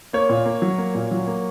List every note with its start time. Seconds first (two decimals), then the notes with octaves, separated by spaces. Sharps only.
0.13 A#3 C#5
0.29 A#2
0.46 A#3
0.62 F#3
0.78 A#3
0.95 A#2
1.11 F#3
1.27 A#3